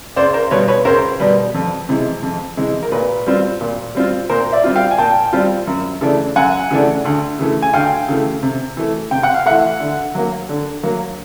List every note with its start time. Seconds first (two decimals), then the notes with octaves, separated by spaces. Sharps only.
0.16 C#2 C5 D5
0.34 A#4 C5
0.51 B2 G3 B4 C#5
0.68 B4 C#5
0.85 C#2 A#4 C5
1.20 B2 G3 B4
1.54 F2
1.89 C3 E3 G#3
2.23 F2
2.57 C3 E3 G#3
2.83 A#4
2.92 A#2 B4
3.26 G3 C4 F4
3.61 A#2
3.95 G3 C4 F4
4.29 A#2 A#4 C5
4.52 D5 E5
4.64 G3 C4 F4
4.76 F5 G5
4.91 G#5
4.98 A#2 G5 A5
5.33 G3 C4 F4
5.67 F#2
6.01 C#3 E3 A3 D4
6.36 F#2 F#5 G#5
6.71 C#3 E3 A3 D4
7.05 D2
7.39 C#3 E3 A3
7.62 G#5
7.73 D2 F5 G5
8.08 C#3 E3 A3
8.43 C3
8.77 E3 A3
9.11 C3 G5
9.23 F#5
9.34 F5
9.46 E3 A3 E5 F#5
9.80 D3
10.15 F#3 A#3
10.49 D3
10.83 F#3 A#3